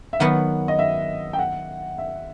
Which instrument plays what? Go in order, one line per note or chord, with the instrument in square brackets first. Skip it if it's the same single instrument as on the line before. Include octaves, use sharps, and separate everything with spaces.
[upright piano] E5
[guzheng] D#3 F#3 B3 F#4 [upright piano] F#5
[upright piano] D#5
E5
G5
F#5
E5